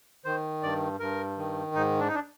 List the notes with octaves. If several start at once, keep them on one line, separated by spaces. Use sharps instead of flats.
D#3 C5
G2 D5
G2 A#4
D#3
G#2 D#4
D4
D#4
D4